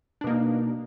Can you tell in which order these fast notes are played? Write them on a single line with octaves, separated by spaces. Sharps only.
D4 B2 A#3 D#4